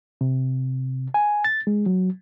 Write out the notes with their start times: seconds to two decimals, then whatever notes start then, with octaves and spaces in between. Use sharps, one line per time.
0.21 C3
1.14 G#5
1.44 A6
1.67 G#3
1.86 F#3